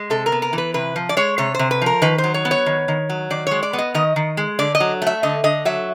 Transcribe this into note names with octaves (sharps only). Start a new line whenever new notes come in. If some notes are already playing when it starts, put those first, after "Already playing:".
Already playing: G#3
C3 A4
A#4
B3
A#4
E3
B4
C3 B4
F3
D5
G#3 C#5
C3 C#5
C3 C5
B4
F3 A#4
D#3 B4
C5
F#3
C#5
B3
C#5
D#3
D#3
F#3
D#3 D5
G#3 C#5
D5
B3
D#5
D#3 D#5
D#3
G#3
D3 D5
D#5
F#3
A3 E5
D3 D#5
D3 D#5
F#3 E5